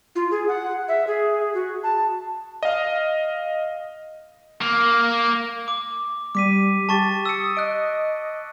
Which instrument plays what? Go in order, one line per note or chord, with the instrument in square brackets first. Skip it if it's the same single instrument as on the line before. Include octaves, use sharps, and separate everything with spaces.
[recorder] F4
G#4
F#5
E5
G#4
F#4
A5
[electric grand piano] D#5 F5
[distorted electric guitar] A#3
[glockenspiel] D6
[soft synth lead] G3 [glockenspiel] D6 B6 D#7
[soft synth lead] G4 [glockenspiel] A5 C#6 A6
[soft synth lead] D#6 [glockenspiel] E6 C#7
[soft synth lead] D#5 [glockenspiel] F#6 D7